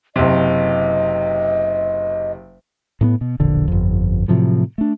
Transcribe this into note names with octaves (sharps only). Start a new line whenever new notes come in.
F#1 C3 D#5
A2 A#3 B3
B2
E1 A#1 D3
G1 F2
A2 C3 F3 F#3
A3 D4